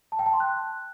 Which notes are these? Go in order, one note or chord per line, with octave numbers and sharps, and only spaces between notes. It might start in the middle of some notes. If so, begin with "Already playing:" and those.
A5
G5
A5
C6
F#6